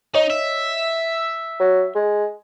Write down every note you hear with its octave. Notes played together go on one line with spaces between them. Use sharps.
D#4 C#5 D#5
E5
F#3
G#3